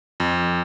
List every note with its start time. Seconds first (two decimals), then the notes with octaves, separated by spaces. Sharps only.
0.20 F2